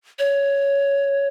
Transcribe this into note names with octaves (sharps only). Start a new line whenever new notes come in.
C#5